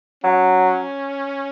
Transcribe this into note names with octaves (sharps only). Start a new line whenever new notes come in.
F#3 C#4